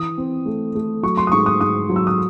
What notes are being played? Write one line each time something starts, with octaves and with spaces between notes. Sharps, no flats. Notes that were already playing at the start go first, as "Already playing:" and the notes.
Already playing: E3 D#6
C4
A3
A3
F#3 C#6
C6
D#6
G#2 C#6
D#6
G#2 D#6
F#3
E6
D#6